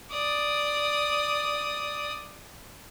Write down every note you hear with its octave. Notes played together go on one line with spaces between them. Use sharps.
D5 D#6